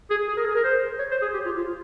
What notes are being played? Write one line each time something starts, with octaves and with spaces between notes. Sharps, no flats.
G#4
G#4
A#4
G#4
A#4
C5
C#5
C5
G#4
G4
F4
F4